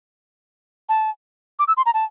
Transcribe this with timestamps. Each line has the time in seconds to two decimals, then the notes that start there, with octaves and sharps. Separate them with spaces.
0.89 A5
1.59 D6
1.68 E6
1.77 C6
1.86 A#5
1.94 A5